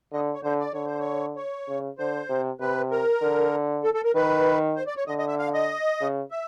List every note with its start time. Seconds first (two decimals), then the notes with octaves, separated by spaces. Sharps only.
0.13 D3 D#5
0.33 C#5
0.43 D3 C5
0.59 D5
0.73 D3 C#5
0.86 C5
0.99 C#5
1.36 C#5
1.68 C#3
1.98 D3 C5
2.29 C3
2.60 C3 B4
2.91 A#4
3.22 D3
3.84 A4
3.94 A4
4.04 A#4
4.15 D#3 B4
4.76 C5
4.87 D5
4.97 C#5
5.07 D3 D#5
5.18 D#5
5.28 E5
5.39 F5
5.53 D#5
6.00 C#3
6.31 E5